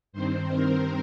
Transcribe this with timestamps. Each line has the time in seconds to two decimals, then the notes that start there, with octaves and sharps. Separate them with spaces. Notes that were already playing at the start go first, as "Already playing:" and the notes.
0.13 G2 D#3 C4 C5
0.51 A#4